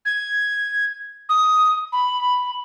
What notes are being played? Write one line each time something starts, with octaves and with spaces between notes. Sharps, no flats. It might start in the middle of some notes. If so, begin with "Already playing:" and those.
G#6
D#6
B5